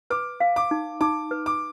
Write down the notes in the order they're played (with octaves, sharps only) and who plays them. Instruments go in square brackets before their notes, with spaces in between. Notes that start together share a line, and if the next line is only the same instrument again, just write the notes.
[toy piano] B4 [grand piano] D6
[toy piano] F5
[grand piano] D6
[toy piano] D#4
[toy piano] D#4 [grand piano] D6
[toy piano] B4
[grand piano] D6